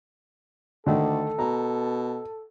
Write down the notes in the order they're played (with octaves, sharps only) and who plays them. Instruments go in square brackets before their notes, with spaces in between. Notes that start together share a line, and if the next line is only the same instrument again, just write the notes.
[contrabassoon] D2 [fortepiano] D3 D#3 A3 [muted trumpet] A4
[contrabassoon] B2 [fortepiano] A#5